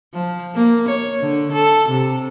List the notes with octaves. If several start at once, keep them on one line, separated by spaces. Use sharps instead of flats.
F3
A#3
C#5
D3
A4
C3